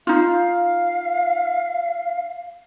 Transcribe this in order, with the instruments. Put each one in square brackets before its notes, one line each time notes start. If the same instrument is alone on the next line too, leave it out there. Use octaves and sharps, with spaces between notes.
[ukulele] D#4 F4 [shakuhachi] F5